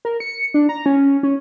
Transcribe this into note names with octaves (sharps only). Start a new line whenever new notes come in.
A#4
C#7
D4
A#5
C#4
C#4